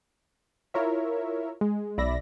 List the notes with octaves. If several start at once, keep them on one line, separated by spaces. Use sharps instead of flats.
E4 F4 A#4 C#5 E5
G#3
B1 D5 E5 B5 A#6